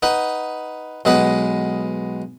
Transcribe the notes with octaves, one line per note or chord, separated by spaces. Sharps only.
D#4 B4 F#5
B1 G#3 B4 D#5 F#5